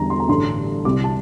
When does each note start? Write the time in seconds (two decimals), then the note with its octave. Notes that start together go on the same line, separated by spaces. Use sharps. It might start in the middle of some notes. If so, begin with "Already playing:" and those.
Already playing: E2 D3 G3 A#5
0.10 C6
0.20 A#5
0.28 A1 G2 D3 C6
0.84 C2 C3 G3 D6
1.04 A5